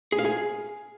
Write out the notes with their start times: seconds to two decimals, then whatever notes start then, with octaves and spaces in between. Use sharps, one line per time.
0.12 G#4
0.19 F5
0.25 G#4